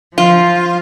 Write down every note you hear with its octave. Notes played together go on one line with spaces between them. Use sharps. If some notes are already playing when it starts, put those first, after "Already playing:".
F3 F4